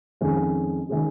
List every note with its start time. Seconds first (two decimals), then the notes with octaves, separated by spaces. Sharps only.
0.21 F2 D#3 G#3 C#4 G#4
0.89 D#3 G#3 C#4 G#4